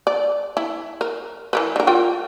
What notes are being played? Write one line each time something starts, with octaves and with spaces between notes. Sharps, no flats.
D5
E4
A#4
E3 A#4 B4
D3 A#4
F4 A#4 G5